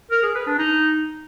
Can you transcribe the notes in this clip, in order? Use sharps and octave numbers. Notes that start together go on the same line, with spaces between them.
A#4
G#4
B4
D4
D#4